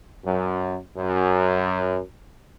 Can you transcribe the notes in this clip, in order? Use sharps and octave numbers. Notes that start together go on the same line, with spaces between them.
F#2
F#2